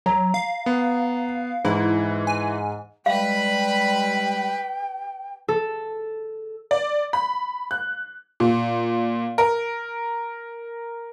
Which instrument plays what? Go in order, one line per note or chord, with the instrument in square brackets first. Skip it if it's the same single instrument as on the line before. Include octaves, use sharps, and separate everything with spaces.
[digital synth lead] F#3 [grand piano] A#5
[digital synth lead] F5
[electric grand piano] B3
[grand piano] G#2 [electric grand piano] E3 [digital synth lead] E4
[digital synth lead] G#5
[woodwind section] G3 G#3 [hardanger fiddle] B4 B5 [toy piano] F5 [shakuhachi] G5
[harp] A4
[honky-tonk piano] D5
B5
F#6
[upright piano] A#2
A#4